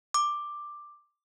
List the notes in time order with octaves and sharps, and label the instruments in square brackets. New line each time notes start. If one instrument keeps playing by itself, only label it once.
[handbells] D6